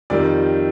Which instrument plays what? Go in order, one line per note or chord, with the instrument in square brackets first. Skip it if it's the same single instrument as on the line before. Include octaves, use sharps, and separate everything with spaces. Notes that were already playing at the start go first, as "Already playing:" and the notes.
[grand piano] F2 D#3 G3 D5